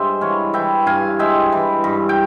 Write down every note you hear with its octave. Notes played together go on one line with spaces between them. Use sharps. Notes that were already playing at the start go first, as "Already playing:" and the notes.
Already playing: G2 G#3 C5 E5 C6
E3 C#5 F5
E3 E5 G5
G2 F5 G#5
G#3 E5 G5
E3
G2
G5